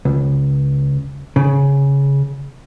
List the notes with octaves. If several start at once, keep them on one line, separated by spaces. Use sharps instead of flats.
C#2
C#3